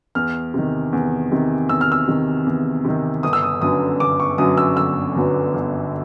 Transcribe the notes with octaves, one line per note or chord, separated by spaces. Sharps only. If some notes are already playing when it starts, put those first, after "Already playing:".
E2 F6
C3 D#3
E2
C3 D#3
E2 E6
F6
E6
C3 D#3
E2
C3 D#3
G1 D#6
E6
D#6
F#2 D3 F#3 B3 D#6
G1 D6
C#6
F#2 D3 F#3 B3 D#6
E6
G1 E6
F#2 D3 F#3 B3
G1